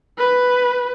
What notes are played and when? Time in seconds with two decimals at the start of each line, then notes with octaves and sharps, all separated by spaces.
0.18 B4